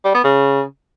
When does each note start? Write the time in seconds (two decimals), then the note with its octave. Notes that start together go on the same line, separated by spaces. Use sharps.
0.05 G3
0.14 B3
0.24 C#3